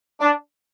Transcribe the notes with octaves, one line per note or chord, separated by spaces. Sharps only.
D4